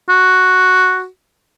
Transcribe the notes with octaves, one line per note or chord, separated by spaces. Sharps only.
F#4